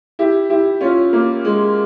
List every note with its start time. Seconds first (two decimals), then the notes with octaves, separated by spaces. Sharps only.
0.19 E4 G4
0.49 E4 G4
0.81 C#4 F4
1.13 A#3
1.45 G#3